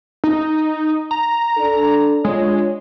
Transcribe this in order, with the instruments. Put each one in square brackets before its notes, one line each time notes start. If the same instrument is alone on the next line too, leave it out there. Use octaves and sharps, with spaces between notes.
[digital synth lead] D#4
A#5
[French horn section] D4 A4
[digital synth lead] G#3 [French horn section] D4 F4 C#5